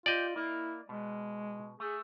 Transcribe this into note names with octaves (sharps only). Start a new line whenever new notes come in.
F4 G4 D5 D#5
A#3 E4
B2 G#3
A3 G#4